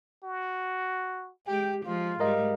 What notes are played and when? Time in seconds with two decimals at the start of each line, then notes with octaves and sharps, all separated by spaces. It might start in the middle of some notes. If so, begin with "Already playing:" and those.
0.24 F#4
1.47 G#3 G4 G5
1.85 F3 G#3 F4
2.20 G#2 G3 A#4 D#5 F5